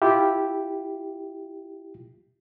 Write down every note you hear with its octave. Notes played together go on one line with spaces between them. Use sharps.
E4 F4 G4